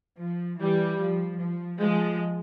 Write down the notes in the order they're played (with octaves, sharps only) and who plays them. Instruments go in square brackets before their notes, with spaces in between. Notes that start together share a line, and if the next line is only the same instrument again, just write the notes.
[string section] F3
E3 G3
F3
F3
F3 G#3